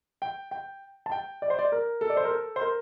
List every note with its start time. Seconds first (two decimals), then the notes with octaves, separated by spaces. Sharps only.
0.22 G5
0.51 G5
1.06 A5
1.12 G5
1.42 D5
1.50 C5
1.59 D5
1.72 A#4
2.01 A4
2.10 D5
2.17 C5
2.25 A#4
2.31 A4
2.56 C5
2.61 A#4